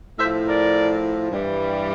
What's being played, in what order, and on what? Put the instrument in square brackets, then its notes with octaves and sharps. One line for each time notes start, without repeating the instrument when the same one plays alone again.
[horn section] A2 C5 E5
F3
A#4 D5
G2 E3 G3